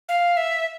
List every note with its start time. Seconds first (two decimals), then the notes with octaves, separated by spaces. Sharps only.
0.09 F5
0.37 E5